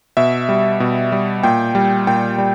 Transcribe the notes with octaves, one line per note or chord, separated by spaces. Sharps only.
B2 E5
G3
B2
G3
A#2 G5
G3
A#2 G5
G3